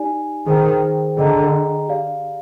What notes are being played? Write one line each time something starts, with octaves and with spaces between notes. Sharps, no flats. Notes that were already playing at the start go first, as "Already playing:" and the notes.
Already playing: D#4 G4 D5 G#5
D#3 G#4 C5 G5
D3 G#4 D#5 G5 A#5
G4 D5 F5